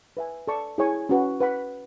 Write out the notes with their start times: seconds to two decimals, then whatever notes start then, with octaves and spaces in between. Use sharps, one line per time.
0.17 B4 E5 G#5
0.48 A4 D5 A5 C#6
0.78 E4 G#4 C#5 G#5 C#6
1.09 C#4 F#4 B4
1.41 B4 F#5 B5